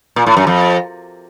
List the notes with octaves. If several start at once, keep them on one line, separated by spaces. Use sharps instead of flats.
A#2
A2
F#2
F2